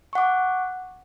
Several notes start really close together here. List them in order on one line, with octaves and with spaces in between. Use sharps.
C#6 F#5 D6